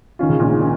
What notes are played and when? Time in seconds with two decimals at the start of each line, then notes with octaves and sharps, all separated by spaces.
0.19 D#3 C#4 F4
0.29 C#2 C#3
0.39 A#1 A#2
0.50 G#2
0.60 D#3 C#4